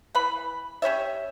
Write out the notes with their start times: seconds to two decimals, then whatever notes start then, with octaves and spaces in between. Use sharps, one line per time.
0.15 E3 B4 B5
0.82 C#4 G4 C#5 E5